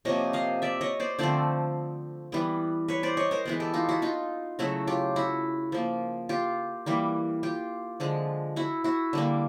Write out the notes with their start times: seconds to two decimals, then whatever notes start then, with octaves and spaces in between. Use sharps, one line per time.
0.05 C3 F3 A#3 C#5 D#5
0.33 D#5 F5
0.62 D5 E5
0.81 C#5 D#5
1.00 C5 D5
1.19 D3 F3 A3 C4 C5 D5
2.32 E3 G3 B3
2.88 B4 C#5
3.03 C5 D5
3.17 C#5 D#5
3.31 A#4 C5
3.45 E3 G#3 B3
3.60 G4 A4
3.74 D#4 F4
3.89 E4 F#4
4.02 D#4 F4
4.59 C#3 F#3 A3 E4 F#4
4.87 F4 G4
5.16 E4 F#4
5.72 F3 A#3
6.29 F4 G4
6.86 E3 G3 A#3
7.43 F4 G4
8.00 D3 F3 G#3
8.56 E4 F#4
8.84 E4 F#4
9.13 D3 G3 A#3